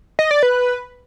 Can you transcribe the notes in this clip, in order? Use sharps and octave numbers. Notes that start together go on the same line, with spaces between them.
D#5
D5
B4